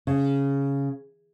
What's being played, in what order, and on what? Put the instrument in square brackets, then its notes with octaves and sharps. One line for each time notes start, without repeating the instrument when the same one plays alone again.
[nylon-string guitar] C#3